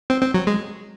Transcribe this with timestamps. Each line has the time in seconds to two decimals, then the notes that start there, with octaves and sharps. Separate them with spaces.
0.10 C4
0.22 C4
0.34 F#3
0.47 G#3